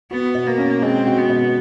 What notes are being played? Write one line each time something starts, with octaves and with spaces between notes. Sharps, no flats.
B3 F#4
B2
A#3
C#4
G#3 C4
F#4
B3
B2